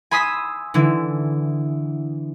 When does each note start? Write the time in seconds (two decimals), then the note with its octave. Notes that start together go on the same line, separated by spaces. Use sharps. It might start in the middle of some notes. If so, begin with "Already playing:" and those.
0.11 G#5 B5 C6 D#6 E6 B6
0.74 D3 E3 E4